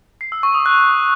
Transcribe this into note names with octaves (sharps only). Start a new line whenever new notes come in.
C7
E6
C#6
D#6
F#6